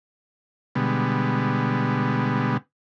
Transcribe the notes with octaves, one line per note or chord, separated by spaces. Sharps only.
B2 D3 G3 G#3 B3